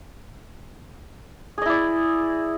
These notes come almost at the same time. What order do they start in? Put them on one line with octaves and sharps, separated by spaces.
G#4 D#5 E4 D5